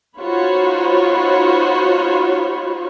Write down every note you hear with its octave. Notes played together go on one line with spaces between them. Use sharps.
D#4 F4 F#4 C5 C#5 B5